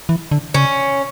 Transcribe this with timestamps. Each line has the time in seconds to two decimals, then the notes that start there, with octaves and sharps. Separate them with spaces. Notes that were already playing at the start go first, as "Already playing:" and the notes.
0.09 E3
0.31 D3
0.54 C#3 C#4